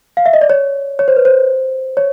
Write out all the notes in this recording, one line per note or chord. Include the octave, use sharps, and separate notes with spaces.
F5
E5
D#5
D5
C#5
C#5
C5
B4
C5
C#5